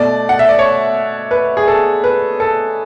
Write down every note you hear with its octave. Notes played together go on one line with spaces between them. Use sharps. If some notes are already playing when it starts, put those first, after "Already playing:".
Already playing: B2 A3 D5
F#5
E5
D5
C#5
B4
G#4
A4
B4
A4